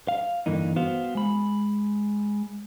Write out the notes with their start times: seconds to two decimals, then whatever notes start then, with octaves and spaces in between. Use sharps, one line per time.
0.08 F5
0.46 G2 D3 E3 A#3 D#4
0.76 B3 F#4 C5 F5
1.15 G#3 B5